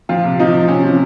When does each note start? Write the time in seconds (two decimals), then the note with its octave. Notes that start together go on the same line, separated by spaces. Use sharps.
0.09 F3 F4
0.24 C3
0.39 F3 D#4
0.54 F3
0.68 C3 C#4
0.83 F3